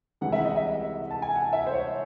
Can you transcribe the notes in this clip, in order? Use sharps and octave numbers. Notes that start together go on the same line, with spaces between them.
C2 C3 E3 G#3 F#5
E5
D#5
E5
A5
G#5
F#5
E5
C5
C#5